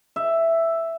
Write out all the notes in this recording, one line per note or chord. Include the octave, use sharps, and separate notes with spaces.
E5